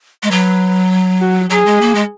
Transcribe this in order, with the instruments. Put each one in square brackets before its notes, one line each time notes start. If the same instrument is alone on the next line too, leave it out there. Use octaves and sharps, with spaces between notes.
[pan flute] G#3
[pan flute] F#3 [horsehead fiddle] B4
[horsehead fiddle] F#4
[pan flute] F#3 [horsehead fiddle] G#4
[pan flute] G#3
A#3
G#3